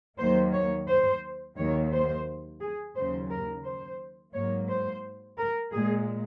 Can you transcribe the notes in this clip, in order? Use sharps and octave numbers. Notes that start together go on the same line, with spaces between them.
D#2 D#3 F#3 A#3 C5
C#5
C5
D#2 D#3 F#3 A#3 C#5
C5
G#4
D#2 C#3 F#3 C5
A#4
C5
G#2 F#3 A#3 C#5
C5
A#4
A#2 G#3 G#4